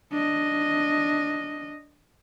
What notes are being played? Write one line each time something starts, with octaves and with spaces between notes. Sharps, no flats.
D4 D#5